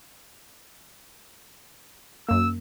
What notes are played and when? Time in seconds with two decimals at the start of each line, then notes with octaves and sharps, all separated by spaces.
2.29 F#2 A#3 E6